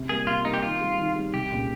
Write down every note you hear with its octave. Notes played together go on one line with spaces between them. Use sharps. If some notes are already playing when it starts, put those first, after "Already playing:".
Already playing: C3
G3 A#3 G#4
C3 F4
G3 A#3 D#4
G4
D#3 F4
G3 C4 G4
D#3
G3 C4 G4
C2 G4
A#2 G#3 C#4